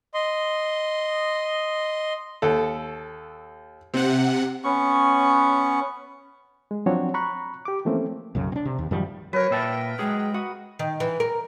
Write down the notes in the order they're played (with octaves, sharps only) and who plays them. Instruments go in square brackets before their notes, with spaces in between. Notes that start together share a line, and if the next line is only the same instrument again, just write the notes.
[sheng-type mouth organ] D#5 C6
[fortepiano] D#2 A4
[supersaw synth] C3 F#5 [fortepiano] C4
[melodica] B3 C#4 C#6
[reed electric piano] G#3
F3 F#3 C4 D4 F#4 C#5
A#5 B5 C#6 F#6
G4 D6
E3 F3 A3 A#3 C4 C#4
[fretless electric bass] B1 F#2 C#3
C4 D4
C3
D#2
F#2 D#3 F3 G3
[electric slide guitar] F#3 [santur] A#4 B4 [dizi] C#5
[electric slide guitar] A#2 E5 A5 [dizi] G5
[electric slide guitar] F#3 G#4 [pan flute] G#3
[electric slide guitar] F#4 [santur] D#6
[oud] D#3
E3
A#4